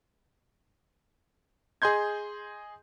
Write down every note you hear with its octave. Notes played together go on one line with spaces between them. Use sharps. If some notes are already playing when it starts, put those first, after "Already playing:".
G#4 D#5 C6 G6 G#6